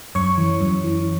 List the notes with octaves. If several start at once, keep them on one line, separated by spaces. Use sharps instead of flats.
F#2 C#5 C#6
E3
F#2
E3